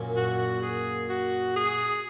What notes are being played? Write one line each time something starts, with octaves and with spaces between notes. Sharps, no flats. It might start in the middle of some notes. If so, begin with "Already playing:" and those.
Already playing: F#2 A#2
F#4
G#4
F#4
G#4